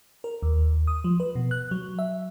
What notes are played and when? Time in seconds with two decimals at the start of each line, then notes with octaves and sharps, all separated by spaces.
0.24 A#4
0.42 D#2
0.87 D#6
1.04 F3
1.20 B4
1.35 B2
1.51 F#6
1.71 F#3
1.99 E5